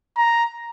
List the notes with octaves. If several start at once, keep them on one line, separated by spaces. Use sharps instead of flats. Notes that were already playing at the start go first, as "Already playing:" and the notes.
A#5